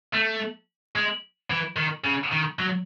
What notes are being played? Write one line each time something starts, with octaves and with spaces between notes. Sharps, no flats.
A3
G#3
E3
D#3
C#3
D#3
F#3